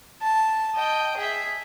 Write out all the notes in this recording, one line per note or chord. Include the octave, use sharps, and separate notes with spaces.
A5
D#5 G5
G#4 E5